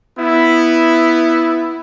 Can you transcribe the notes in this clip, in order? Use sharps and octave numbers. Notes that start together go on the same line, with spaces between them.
B3 E4